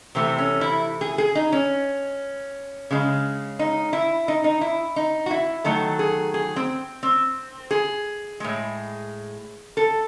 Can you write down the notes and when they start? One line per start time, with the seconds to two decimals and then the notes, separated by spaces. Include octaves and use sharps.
0.15 C3 E3 A3 C4
0.38 C#4
0.61 E4
1.01 G#4
1.18 G#4
1.35 D#4
1.53 C#4
2.91 C#3 G#3
3.59 D#4
3.93 E4
4.28 D#4
4.44 D#4
4.61 E4
4.96 D#4
5.26 F#4
5.31 E4
5.64 D#3 F#3 A3 A4
5.99 G#4
6.34 G#4
6.56 C4
7.03 C4
7.71 G#4
8.40 A2 G#3
9.77 A4